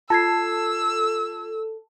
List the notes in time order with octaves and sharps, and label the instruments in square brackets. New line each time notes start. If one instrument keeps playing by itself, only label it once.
[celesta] F4 G#6 C7 [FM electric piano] A4 [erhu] E6